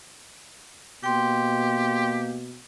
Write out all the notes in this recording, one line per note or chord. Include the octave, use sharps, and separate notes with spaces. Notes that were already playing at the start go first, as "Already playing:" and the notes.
B2 A#3 G4 G5 C6